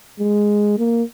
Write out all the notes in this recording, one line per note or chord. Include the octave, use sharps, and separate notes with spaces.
G#3
A#3